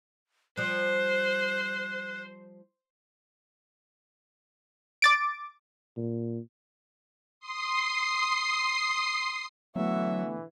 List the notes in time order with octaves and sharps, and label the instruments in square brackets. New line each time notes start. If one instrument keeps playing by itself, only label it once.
[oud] F3 G3 [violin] C5 [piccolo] F#6
[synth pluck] D6 A6 D7
[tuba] A#2
[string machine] C6 D#6 C7
[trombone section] D3 E3 [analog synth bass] F#3 [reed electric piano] A3 B3 [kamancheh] F#4 E5